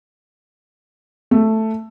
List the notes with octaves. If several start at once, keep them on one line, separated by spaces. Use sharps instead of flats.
A3